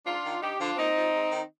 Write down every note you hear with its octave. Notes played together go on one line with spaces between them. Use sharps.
G#2 D4 F4
D#3
G2 D#4 G4
D3 F3 D4 F4
A#2 C4 D#4
F3
G#2
D#3